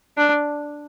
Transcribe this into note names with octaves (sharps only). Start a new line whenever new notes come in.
D4